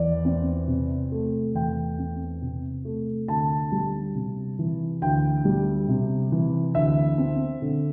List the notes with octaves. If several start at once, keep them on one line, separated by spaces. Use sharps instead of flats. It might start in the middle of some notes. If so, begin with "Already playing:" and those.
Already playing: E2 D5
C4
C3
A3
E2 G5
C4
C3
A3
D2 A5
G3
C3
E3
D2 G5
G3
C3
E3
D2 E5
C4
D3